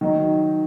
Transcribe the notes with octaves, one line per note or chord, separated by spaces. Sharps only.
D#3 F#3 D#4